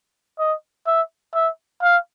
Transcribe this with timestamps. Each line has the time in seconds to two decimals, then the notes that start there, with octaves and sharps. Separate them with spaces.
0.39 D#5
0.87 E5
1.34 E5
1.82 F5